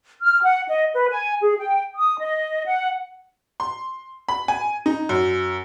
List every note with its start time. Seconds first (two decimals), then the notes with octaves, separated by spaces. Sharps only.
0.21 F6
0.42 F#5
0.68 D#5
0.93 B4
1.09 G#5
1.41 G#4
1.58 G5
1.95 D#6
2.20 D#5
2.65 F#5
3.60 C6
4.29 B5
4.48 G#5
4.86 D#4
5.09 F#2